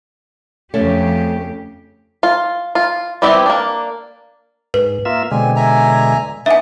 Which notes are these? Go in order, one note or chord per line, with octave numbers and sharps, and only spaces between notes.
F2 C#3 A3 C#4 G4
F4
F4
G3 B3 C4 E4 G4
A#3 D4
G#2 B4
A#3 F4 E5
B2 D3 G#3 C4 G#5
E5 G#5 A#5
B3 D4 D#4 D#5 E5 G#5